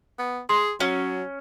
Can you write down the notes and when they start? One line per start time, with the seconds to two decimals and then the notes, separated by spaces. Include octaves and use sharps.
0.19 B3
0.49 G#4 C6
0.80 F#3 C#4